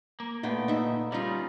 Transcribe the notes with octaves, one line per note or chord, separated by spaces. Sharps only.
A#3
A#2 A3 B3 G5
D#4 E5
G3 C#4 D#4 F4